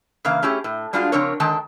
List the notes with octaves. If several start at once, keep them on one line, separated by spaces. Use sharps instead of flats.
C#3 E3 A#3 F5
A3 C#4 E4 G4 G#4
A2
G3 G#3 D4 F4 F#4 F5
C#3 F3 C4 D4 A#4 C#5
D3 D#3 G#3 G5 A5